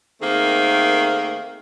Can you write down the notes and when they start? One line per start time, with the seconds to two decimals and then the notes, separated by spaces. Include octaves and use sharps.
0.21 D#3 A3 A#3 C4 G#4